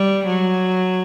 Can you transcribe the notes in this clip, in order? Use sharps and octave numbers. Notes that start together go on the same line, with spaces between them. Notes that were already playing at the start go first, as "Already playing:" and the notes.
Already playing: G3
F#3